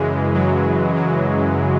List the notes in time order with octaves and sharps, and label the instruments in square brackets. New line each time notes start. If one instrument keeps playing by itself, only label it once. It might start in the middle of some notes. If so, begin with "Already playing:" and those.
Already playing: [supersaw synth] F#2 C#3 E3 G#3
F#3
F#3